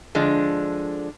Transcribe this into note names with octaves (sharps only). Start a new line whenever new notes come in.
D3 F3 G#3 D4